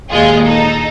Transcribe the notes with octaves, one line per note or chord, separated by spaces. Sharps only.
D#2 A#2 G#3 F4 G#4
D#4 A4